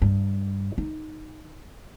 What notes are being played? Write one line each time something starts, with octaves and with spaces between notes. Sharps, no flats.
G2
D#4